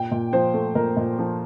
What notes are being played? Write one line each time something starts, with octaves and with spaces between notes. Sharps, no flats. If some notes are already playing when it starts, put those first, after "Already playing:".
Already playing: A#2 G5
A#2
F3 C5
A3
A#2 A#4
A#2
F3